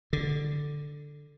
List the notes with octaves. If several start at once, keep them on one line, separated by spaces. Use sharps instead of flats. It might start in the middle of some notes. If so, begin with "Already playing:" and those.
D3